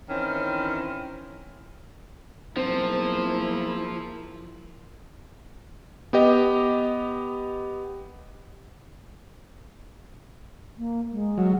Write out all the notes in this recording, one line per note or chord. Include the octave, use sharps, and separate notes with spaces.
D#3 E3 C4 C#4 E4
B1 F3 A#3 C4 E4 G#4 A5
B3 G4 D#5
A#3
G#3
F#3